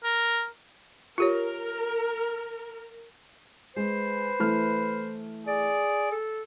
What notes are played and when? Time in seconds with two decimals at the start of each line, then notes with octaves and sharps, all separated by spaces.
0.04 A#4
1.18 F4 G4 A#4 C#5
3.76 G#3 B4 C5
4.39 E3 A3 F6
5.47 G#4 D5
6.11 A4